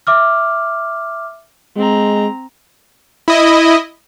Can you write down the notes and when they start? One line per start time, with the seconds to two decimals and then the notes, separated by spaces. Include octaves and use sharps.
0.07 E5 D6 F6
1.77 G#3 C4 A#5
3.28 E4 D#5